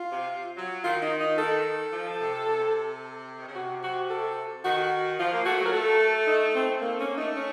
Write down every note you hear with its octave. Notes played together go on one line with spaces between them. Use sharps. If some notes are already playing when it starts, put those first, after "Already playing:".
Already playing: F4
C3
F#3
D#3 F4
D#4
D#4
A4
F3
C3
C3
D#3
C#3
C3 F#4
F#4
A4
D#3 F#4
F3 F4
A#3
A3 F#4
F#3
A#4
A3 A4
D#4
C4
A3 A#3
A#3 C#4
A3 D#4
C#4